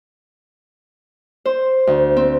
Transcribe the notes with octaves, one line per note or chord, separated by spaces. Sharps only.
C5
D2
C4